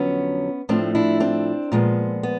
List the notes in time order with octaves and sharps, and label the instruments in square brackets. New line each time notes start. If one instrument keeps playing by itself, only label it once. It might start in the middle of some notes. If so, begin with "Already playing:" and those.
Already playing: [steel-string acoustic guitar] F2 D3 F#3 B3 C#4
A2 F3 A3 C4 D4
D4 E4
C4 D4
A#2 F3 G#3 B3
B3